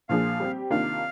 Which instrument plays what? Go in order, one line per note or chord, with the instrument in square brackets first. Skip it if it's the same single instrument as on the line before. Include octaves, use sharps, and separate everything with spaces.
[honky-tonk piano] A#2 F3 A#3 D4 G#4 [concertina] F5
[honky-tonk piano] G3 C4 G4
[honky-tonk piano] C3 D#3 A#3 D4 F4 [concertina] F5